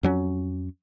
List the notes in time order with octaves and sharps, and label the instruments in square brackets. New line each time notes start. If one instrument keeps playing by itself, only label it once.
[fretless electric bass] F2 F#3 C#4